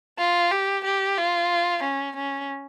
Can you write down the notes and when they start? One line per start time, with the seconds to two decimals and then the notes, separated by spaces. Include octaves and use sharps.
0.18 F4
0.51 G4
0.85 G4
1.18 F4
1.83 C#4
2.16 C#4